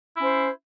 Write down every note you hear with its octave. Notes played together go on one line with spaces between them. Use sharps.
C#4 E4 C5